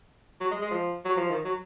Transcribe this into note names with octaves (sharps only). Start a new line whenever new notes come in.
F#3
G#3
G#3
F3
F#3
F3
D#3
F#3